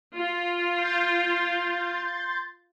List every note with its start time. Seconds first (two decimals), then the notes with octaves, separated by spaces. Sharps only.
0.16 F4
0.77 C6 G6 A6